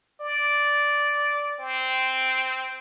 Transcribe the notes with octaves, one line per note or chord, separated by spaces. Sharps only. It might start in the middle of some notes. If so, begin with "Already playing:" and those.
D5
C4